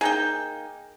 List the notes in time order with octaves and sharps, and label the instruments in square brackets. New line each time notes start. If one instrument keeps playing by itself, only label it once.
[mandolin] A#3 D#4 G6 [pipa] G#4 G5